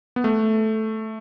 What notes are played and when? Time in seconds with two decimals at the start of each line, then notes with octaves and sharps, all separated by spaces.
0.16 B3
0.24 A3